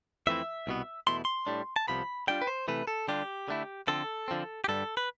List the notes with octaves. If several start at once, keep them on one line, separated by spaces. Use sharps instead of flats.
F2 E3 A3 C4 E4 E5
C2 B2 B3
E2 B2 A3 E4 C6
C6
A2 G3 D4
A5
C2 C3 F3 B3 B5
D3 G3 D4 F4 G5
B4
C5
C3 E3 A3 B4
A4
D3 G3 D4 F4 G4
D3 A3 E4
D3 F3 C4 A4
D3 F3 C4
G4
G2 D3 G3 A4
B4